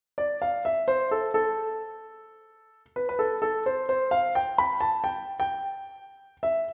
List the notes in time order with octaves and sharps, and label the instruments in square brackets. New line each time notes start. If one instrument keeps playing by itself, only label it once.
[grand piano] D5
F5
E5
C5
A4
A4
B4
B4
A4
A4
C5
C5
F5
G5
B5
A5
G5
G5
E5